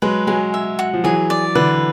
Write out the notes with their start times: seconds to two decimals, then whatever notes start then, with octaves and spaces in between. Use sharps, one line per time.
0.02 F#3 G#3 B4
0.27 F#3 G#3 G#5
0.54 E5
0.79 F#4
0.93 F3
1.04 E3 F#3 G#4
1.30 D5
1.55 D3 E3 B4